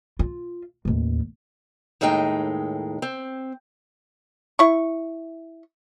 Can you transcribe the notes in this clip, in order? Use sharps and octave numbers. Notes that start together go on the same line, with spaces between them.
F4
A1 D#2
D#2 A2 G#3 D#4 G5
C4
E4 C#6